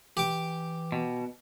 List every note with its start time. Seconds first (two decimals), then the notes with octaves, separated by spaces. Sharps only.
0.17 E3 G4 D6
0.92 B2